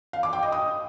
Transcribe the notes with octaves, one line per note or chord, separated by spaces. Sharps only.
F5
D6
G5
D#5
D#6